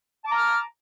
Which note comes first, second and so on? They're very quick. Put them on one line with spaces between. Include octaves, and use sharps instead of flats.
A5 D6 A#5 F6